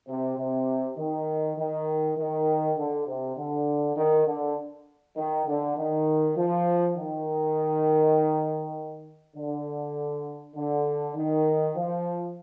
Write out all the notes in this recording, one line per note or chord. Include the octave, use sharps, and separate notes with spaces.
C3
C3
D#3
D#3
D#3
D3
C3
D3
D#3
D3
D#3
D3
D#3
F3
D#3
D3
D3
D#3
F3